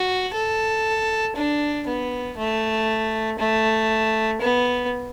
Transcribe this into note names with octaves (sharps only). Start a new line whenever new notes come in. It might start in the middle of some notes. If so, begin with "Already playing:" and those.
Already playing: F#4
A4
D4
B3
A3
A3
B3